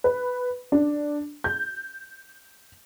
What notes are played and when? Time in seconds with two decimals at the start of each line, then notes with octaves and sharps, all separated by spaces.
0.04 B4
0.72 D4
1.44 G6